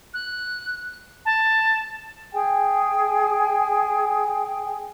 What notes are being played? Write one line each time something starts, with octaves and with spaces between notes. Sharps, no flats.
F#6
A5
G#4 G5 G#5